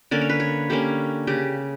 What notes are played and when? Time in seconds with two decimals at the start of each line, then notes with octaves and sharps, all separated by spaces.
0.11 D3 A#3 C#4 D5
0.21 C#5
0.29 B4
0.40 C#5
0.70 D3 A#3 C#4 G4
1.27 C#3 G4